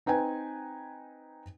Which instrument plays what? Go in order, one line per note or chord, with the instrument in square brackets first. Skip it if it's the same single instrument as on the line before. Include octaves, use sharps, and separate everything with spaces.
[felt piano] C4 D#4 B4 G5 G#5